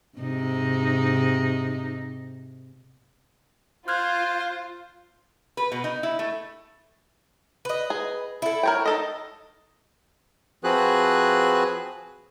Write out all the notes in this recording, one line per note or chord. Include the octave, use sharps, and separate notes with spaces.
G#2 C3 D#4
F4 C5 F6 F#6 G#6
B4
B2
D#4
E4
A3
B4 D#5
G#4
E4 A4
A#4 C#5 G5
D#4 A4 D#5
F3 C4 F#4 G#4 B4 F#6